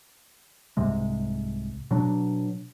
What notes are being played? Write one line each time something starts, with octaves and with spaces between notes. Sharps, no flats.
C2 G#2 C3 G#3
B2 F#3 D4